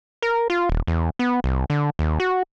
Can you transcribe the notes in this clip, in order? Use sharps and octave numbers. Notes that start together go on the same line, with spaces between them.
A#4
F4
D#1
E2
B3
C2
D3
D#2
F#4